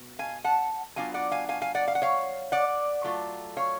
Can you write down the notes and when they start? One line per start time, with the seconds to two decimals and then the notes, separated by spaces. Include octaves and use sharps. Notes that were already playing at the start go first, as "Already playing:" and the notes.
Already playing: B2
0.19 F5 G#5
0.44 F#5 A5
0.96 F#3 B3 D4 F4 F5 G#5
1.14 D5 F#5
1.31 F5 G#5
1.49 F5 G#5
1.62 F5 G#5
1.75 D5 F#5
1.88 F5
1.95 F#5
2.02 C#5 F5
2.52 D5 F#5
3.04 F#3 A3 F4
3.57 C#5 F5